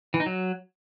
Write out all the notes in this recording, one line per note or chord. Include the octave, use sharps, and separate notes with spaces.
E3
D#4
F#3